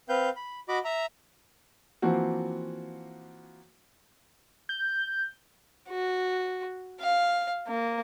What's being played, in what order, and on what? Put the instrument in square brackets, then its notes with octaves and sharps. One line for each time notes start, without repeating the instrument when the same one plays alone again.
[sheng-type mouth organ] C4 B4 F5 G6
B5
F#4 D#5 B5 D6
E5 A#5
[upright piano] E3 F3 A#3 C4 F#4
[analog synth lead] G6
[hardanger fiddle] F#4
F5
A#3